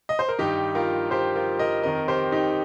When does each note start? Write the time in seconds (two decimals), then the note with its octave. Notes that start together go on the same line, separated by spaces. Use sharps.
0.09 D#5
0.19 C5
0.29 A#4
0.39 G2 D#3 D#4 G4
0.75 F4 A#4
1.11 G4 C5
1.35 F4 A#4
1.59 A#4 D#5
1.83 F2 D#3 A#4 D#5
2.08 G4 C5
2.32 D#4 G4